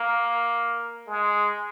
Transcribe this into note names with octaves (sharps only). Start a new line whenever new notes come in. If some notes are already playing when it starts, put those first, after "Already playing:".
Already playing: A#3
G#3